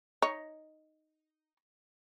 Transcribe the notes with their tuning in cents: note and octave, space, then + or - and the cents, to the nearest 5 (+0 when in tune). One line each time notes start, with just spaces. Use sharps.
D#4 +0 C#5 +0